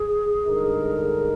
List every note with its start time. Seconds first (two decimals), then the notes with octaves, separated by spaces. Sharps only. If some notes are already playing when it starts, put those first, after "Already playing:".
Already playing: G#4
0.44 G2 D3 G#3 D#4 A#4